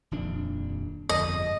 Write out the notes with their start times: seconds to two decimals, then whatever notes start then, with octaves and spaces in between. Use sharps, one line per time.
0.11 D#1 F2 D4
1.09 G1 F2 G#2 D#5